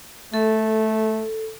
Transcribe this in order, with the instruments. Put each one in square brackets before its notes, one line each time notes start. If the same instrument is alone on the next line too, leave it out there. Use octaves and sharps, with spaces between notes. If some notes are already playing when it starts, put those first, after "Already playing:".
[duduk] A3 [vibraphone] A4